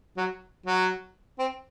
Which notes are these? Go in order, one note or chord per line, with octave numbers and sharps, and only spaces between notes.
F#3
F#3
C4